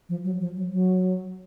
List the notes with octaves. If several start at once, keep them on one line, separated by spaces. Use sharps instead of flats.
F3
F#3
F3
F#3
F#3